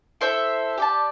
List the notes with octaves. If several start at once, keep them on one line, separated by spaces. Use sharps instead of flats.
E4 A4 C5 E5
G4 D5 A5